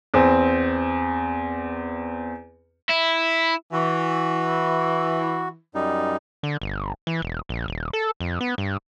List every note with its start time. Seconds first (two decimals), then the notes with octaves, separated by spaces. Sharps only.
0.14 E2 C4
2.90 E4
3.72 E3 F#4
5.75 F#2 G3 D#4
6.43 D3
6.62 G1
7.07 E3
7.22 E1
7.49 A#1
7.68 D#1
7.93 A4
8.20 F2
8.41 B3
8.58 G2